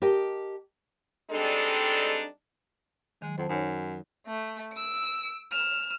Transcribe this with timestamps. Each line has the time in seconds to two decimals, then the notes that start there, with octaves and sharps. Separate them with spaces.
0.02 G4 A#4 D#5 G5 A5
1.31 G3 G#3 C4 D4 D#4 A4
3.22 D#3 F#3 G#3
3.38 F2 C5 F#5 A5
3.49 F#2 D#4 C#5
4.27 A3
4.73 E6 D7
5.52 F6 E7